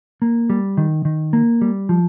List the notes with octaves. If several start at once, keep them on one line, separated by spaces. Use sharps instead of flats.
A#3
G3
D#3
D#3
A#3
G3
F3